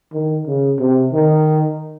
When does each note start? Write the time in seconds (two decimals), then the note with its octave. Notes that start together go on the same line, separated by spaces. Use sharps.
0.13 D#3
0.47 C#3
0.80 C3
1.13 D#3